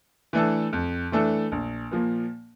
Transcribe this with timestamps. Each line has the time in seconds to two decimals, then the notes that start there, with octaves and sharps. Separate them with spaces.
0.33 E3 A3 D4 A4
0.73 F2
1.12 E3 A3 D4 A4
1.52 A#1
1.91 A#2 F3 A#3